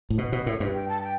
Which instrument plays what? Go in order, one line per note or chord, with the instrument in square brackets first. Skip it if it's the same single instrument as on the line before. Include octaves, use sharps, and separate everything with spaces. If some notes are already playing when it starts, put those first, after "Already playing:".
[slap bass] A2
B2
B2
A2
G2
[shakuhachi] G5
A5
G5